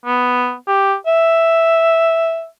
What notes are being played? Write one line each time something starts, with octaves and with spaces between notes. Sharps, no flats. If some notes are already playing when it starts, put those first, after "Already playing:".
B3
G4
E5